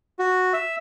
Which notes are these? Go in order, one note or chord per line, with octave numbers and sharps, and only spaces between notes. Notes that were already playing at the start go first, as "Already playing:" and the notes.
F#4
E5